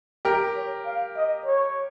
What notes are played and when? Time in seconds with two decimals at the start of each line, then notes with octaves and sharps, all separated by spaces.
0.25 G4 A#4
0.56 C#5
0.85 F5
1.16 D#5
1.46 C#5